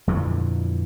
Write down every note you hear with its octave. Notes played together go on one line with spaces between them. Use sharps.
F2 A#2 D3 E3